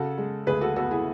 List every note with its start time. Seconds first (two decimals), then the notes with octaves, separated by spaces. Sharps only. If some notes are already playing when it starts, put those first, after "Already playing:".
Already playing: C#3 F#4 A4
0.18 G#3
0.47 D2 G#4 B4
0.61 F#4 A4
0.76 B3 F#4 A4
0.91 E4 G#4